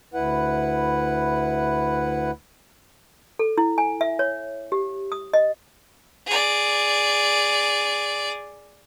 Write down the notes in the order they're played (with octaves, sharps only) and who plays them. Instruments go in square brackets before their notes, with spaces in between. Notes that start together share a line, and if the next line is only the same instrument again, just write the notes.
[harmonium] D2 E4 B4 F#5
[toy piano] A4
E4
G#5
E5
C#5
G4
D#6
D#5
[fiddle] G#4 D5